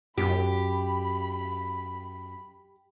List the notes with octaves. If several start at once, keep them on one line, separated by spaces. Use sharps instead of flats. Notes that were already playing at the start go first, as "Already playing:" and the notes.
F#2 G4 B5